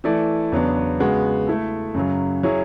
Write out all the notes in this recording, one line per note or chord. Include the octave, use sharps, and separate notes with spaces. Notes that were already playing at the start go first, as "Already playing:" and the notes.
E3 A3 E4 A4 D5
E2 C#3 F#3 B3 D4
C#3 G#3 B3 F#4
A3 E4 A4
F#2 C#3 F#3
F#3 C#4 E4 G#4